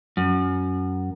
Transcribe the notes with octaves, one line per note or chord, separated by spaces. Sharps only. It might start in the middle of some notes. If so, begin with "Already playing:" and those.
F#2